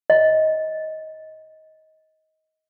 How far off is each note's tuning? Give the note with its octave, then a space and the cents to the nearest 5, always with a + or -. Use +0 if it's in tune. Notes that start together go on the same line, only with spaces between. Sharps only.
D#5 +15